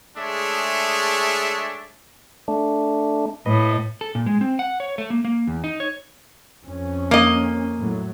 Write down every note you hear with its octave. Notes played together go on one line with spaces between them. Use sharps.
G#3 A3 D4 G#4 C#5 E5
A3 D4
A2 B4 D#5
A4
A#2
G#3
C4
F#5
C#5
A3
A#3
A#3
E2
D#4
C#5
F2 C#4
A#3 D#5
A2 F#3